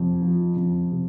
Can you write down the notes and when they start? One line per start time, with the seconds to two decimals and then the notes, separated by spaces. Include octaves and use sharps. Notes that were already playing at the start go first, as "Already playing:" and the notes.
Already playing: F2 C3
0.22 F3
0.56 F2
0.92 C3